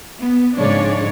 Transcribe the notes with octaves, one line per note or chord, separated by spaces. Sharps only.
B3
F2 G#2 C#3 D4 C#5 D5